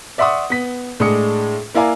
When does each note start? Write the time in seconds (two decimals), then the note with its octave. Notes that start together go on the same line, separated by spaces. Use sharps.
0.18 D5 E5 F#5 C6 C#6 D#6
0.50 B3 B6
1.00 A2 G#3 D4 G#4 D#6 C#7
1.75 A#3 E4 D5 F5 G#5 A#5